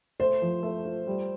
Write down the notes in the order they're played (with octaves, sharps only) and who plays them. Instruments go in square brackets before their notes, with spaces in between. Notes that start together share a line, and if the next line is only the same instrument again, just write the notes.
[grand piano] A3 [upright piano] C5
[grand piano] F3
A3
F4
G3